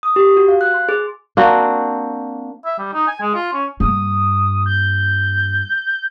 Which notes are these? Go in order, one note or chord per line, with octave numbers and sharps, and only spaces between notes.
D#6
G4
F#4
F5
F#6
C6
G#4
A#3 C4 D4 F#4
E5
G3
D#4
G#5
G#3
F4
C#4
G2 A#3 D#6
G6